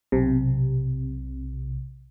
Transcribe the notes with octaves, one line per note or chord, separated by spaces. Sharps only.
B1 C3